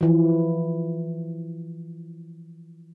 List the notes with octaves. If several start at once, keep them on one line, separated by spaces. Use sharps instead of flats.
E3 F3